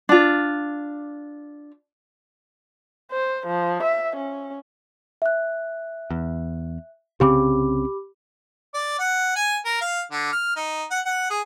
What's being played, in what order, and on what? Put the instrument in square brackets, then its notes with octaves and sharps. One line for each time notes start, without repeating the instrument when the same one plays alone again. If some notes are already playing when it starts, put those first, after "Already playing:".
[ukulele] D4 F4
[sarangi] C5
F3
E5
C#4
[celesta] E5 F#6
[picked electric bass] E2
[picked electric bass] C2 C#3 C4 [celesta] G4 B5 D6
[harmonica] D5
F#5
G#5
A#4
F5
D3
F6
D#4
F#5
F#5
G#4